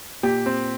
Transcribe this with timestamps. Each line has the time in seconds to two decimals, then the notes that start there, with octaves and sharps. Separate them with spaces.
0.23 A#2 G4
0.46 C4